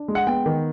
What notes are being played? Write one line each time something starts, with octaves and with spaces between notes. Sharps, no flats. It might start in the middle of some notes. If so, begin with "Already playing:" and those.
Already playing: D4
G#3
F#5
B3 G5
D#3